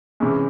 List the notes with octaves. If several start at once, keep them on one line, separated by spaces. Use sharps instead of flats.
C3 E3 G#3 C#4